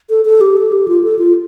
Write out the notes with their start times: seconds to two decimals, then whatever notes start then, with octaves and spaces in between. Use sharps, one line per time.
0.10 A4
0.25 A4
0.41 G4
0.57 A4
0.72 G4
0.88 F4
1.04 A4
1.19 F4